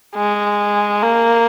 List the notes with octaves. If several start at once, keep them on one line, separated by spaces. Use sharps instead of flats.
G#3
A#3